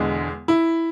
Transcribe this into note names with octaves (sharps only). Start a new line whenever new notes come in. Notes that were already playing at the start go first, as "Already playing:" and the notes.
Already playing: E1 E2 D3 G#3
E4